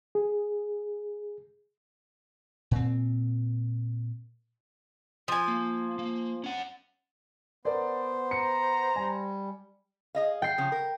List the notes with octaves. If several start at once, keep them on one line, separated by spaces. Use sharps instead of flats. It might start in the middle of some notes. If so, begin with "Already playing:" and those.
G#4
A#2 C4
F3 G#5
A#3
A#3
C#4 F#5
B3 A#4 C5 D5
A#5 C#7
G3 G#5
G#4 D#5 F5
G5 C7
C#3 F3 C#4
A#4